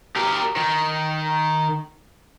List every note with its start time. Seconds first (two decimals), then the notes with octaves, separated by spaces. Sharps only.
0.16 G4 A#4
0.56 D#3